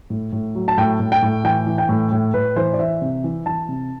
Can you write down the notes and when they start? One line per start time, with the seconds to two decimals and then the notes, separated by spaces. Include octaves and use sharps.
0.10 A2
0.33 A2
0.55 F#3
0.68 A5
0.78 A2 G5
1.00 A2
1.12 G5
1.22 A2
1.44 E3 G5
1.67 E3
1.78 G5
1.89 A2
2.12 A2
2.34 A2 B4
2.56 E3 C5
2.74 D5
2.79 E3 E5
3.02 C3
3.24 E3
3.46 E3 A5
3.69 C3